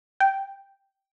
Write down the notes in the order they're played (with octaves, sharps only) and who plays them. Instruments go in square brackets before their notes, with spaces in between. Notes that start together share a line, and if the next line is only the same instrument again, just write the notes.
[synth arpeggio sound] G5